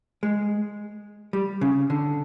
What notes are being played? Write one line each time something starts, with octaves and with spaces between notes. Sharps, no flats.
G#3
G3
C#3
D3